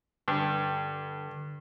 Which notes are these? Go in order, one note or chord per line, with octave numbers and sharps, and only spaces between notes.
G2 D3